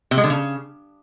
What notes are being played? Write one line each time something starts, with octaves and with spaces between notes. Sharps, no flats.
C3
G#3
D3
C#3